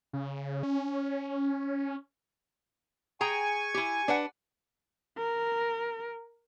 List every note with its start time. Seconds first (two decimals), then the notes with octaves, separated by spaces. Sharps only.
0.13 C#3
0.63 C#4
3.21 G#4 G5 G#5 A#5 C#6
3.74 E4 G4
4.08 D4 B4 F#5
5.18 A#4